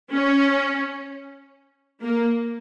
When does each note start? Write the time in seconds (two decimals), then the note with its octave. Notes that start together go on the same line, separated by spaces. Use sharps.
0.14 C#4
2.04 A#3